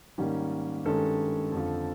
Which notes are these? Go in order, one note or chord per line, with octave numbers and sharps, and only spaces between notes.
G#2 D#3 G3 A#3 C#4
G2 D#3 G#3 C#4 A4
F2 D3 F3